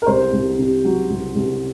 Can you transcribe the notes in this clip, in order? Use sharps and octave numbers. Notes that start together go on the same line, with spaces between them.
A#4
C2 C5
C2
C3
F#3
C2
C2